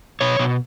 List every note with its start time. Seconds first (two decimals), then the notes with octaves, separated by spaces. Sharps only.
0.21 B2 C#5
0.39 B2